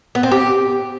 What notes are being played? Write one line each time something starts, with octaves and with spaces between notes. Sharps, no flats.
B3
C4
G4